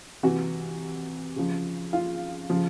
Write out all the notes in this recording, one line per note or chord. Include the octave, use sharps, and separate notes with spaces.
C3 E3 F#4
C#3 F3
F4
C#3 F3